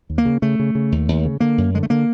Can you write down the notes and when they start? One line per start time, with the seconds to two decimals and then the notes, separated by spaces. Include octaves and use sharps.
0.10 D#2
0.18 A#3
0.25 C#3
0.42 C#3 A3
0.59 C#3
0.75 C#3
0.92 D#2
1.08 D#2
1.25 C#3
1.40 D3 A#3
1.58 F#2
1.74 D3 G#3
1.83 A3
1.90 D3 A#3